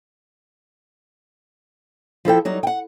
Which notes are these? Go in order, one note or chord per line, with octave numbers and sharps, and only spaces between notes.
F3 E4 A4 G5
F#3 G3 D#4
F#5 G5